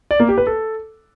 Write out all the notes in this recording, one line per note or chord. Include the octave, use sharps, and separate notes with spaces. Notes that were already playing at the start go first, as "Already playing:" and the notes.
D5
A#3
G4
B4
A4